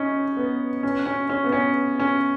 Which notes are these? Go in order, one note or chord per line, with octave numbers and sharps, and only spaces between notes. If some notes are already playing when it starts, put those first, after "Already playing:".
Already playing: C#4 D#4
B3
C#4
C#4
C#4
B3
C#4
C#4